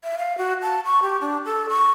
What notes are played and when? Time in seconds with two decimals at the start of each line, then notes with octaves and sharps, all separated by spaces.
0.04 E5
0.18 F5
0.38 F#4
0.62 A5
0.85 C#6
1.02 G4
1.21 D4
1.46 A4
1.69 C#6